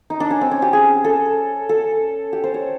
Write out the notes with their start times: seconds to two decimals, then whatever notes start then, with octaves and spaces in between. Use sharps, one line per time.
0.10 D#4
0.20 D4
0.30 C#4
0.41 C4
0.51 C#4
0.62 G4
0.73 G#4
1.04 A4
1.69 A4
2.33 G4
2.44 C5
2.54 C#5